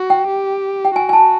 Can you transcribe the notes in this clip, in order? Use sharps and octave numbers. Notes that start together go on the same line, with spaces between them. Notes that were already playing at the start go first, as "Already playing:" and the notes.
Already playing: F#4
G5
G4
G5
F#4 G#5
G#5
A5